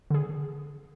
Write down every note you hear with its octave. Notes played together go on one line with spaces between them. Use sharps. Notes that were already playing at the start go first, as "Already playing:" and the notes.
D3 G#4